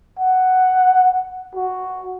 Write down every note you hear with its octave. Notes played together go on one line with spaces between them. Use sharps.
F#5
F#4